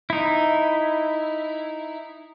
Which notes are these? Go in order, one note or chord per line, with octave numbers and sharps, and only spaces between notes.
D#4 E4